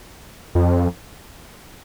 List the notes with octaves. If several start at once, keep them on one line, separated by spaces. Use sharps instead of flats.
F2